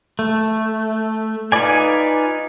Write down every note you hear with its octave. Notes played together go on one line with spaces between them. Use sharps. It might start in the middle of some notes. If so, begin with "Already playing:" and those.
A3
D#4 F4 B4 D5 G#5